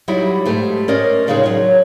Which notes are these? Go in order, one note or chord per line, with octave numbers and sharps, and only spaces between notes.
F#3 G3 D#4 E4 G4
G#2 A3 G4
C#4 A#4 C5 D5 D#5
A2 C#3 F3 G#3 D#4 G#4
F#3 C#5